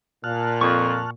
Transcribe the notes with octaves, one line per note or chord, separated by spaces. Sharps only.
A#2 A5 F6 F#6
F2 C#6